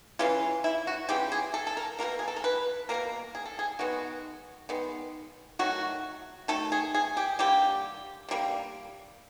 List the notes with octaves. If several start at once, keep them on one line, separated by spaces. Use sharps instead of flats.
C#3 E3 G#3 F4
E4
F#4
C#3 E3 G#3 G4
G#4
A4
A4
A#4
B2 F#3 A#3 A#4
G#4
A4
A#4
B4
B2 F#3 A#3 A#4
G#4
A4
G#4
D#3 G#3 B3 F#4
D#3 G#3 B3
D#3 F#3 A3 F#4
D#3 F#3 A3 A4
G#4
G#4
G4
D3 G3 A#3 G4
D3 G3 A#3